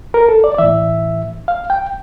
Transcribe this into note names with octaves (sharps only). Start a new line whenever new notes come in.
A#4
A4
D5
D5
A2 E3 E5
F5
G5